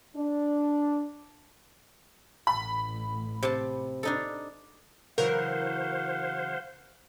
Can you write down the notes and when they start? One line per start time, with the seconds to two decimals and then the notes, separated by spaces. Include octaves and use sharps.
0.16 D4
2.47 A1 B5
3.43 C3 A5
4.03 D4 D#4 A4
5.18 C#3 E3 F#3 A#4 C5 F5 F#5